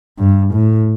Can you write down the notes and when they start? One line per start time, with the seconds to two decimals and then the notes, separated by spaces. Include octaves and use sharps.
0.19 G2
0.54 A2